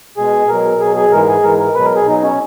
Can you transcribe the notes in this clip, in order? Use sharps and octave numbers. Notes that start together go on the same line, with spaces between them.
B2 G#3 G#4
B2 F#3 A#4
B2 F#3 G#4
G#4
G#2 E3 G#3 A#4
G#4
G#2 E3 G#3 A#4
A#4
B2 F#3 B4
A#4
G#4
B2 F#3 D#4
C#4